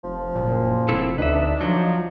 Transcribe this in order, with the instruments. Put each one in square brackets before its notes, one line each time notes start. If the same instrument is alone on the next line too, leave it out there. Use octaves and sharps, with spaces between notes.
[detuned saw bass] F1 [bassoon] F3
[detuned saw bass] F#1 [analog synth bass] A#2
[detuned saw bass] F1 [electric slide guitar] C4 E4 A4
[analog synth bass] D2 [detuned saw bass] D4 [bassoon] D#4 [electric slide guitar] B4 E5
[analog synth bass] F3 [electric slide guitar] F#3